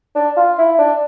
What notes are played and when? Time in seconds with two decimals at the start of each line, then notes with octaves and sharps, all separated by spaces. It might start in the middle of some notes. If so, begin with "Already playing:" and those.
0.15 D4
0.37 F4
0.58 E4
0.79 D4